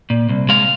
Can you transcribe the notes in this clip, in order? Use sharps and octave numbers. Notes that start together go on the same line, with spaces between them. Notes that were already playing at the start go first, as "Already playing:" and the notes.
A#2
C2
G#3 F5